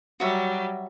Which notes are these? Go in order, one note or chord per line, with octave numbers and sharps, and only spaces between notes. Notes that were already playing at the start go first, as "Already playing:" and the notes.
F#3 G3 F#4 E5 A#5